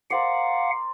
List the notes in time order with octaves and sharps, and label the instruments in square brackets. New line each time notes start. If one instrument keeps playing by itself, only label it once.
[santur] A#4 C5 D5 [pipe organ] F5 F#5